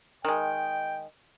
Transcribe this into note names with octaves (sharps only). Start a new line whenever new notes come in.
D#3 G#3 G5